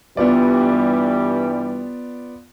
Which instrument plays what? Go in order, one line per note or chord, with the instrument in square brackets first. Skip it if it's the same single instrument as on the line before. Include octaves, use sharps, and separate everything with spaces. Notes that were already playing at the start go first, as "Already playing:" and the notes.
[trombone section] G2 E3 G3 [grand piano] B3 F4 D5